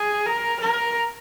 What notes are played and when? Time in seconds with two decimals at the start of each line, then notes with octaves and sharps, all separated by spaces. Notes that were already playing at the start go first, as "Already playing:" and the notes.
Already playing: G#4
0.26 A#4
0.60 A#4